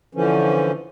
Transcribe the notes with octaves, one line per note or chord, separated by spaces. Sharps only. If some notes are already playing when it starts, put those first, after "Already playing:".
D3 E3 F3 C#4